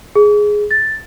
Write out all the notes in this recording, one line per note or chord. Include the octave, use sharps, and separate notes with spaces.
G#4
A6